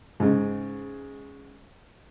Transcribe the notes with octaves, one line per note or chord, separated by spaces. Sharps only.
G#2 C#3